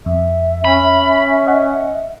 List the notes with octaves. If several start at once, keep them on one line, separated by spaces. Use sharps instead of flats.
F2 E5
C#4 B5
D#5 F#5